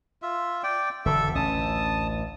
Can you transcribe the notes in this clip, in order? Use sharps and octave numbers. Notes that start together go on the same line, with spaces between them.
F4 E5
D5 G5
E1 D3 A4 E5
A1 D2 C#4 A5 D#6